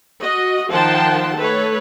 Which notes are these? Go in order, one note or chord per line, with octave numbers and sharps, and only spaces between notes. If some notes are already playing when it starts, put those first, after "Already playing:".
F#4 D#5
D#3 F3 F#5 G5 A5 C6
A3 A4 B4 C#5